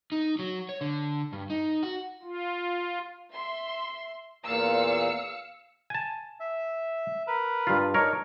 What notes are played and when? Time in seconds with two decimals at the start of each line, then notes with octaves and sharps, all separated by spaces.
0.12 D#4
0.39 F#3
0.69 C#5
0.81 D3
1.33 G2
1.50 D#4
1.83 F#4
2.23 F4
3.31 E5 C6
4.45 E2 A#2 F5 E6 C#7
5.90 G#5 A5
6.40 E5
7.27 A#4 B4
7.67 G2 F4
7.94 D4 D#4 A#4 C#5